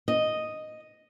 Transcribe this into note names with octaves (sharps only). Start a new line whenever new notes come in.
D#5